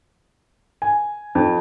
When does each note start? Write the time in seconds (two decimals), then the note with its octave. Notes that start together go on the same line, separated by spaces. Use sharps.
0.82 G#5
1.35 F2